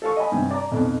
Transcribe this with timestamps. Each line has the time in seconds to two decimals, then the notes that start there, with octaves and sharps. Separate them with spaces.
0.02 A4 F5 C#6
0.17 D#5 G#5 B5
0.32 G2 C3
0.51 D5 A#5
0.71 B1 F2